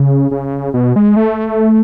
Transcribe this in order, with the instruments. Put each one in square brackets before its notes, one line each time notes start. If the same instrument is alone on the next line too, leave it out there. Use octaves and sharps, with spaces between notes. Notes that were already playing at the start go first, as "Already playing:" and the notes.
Already playing: [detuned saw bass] C#3
C#3
B2
G#3
A3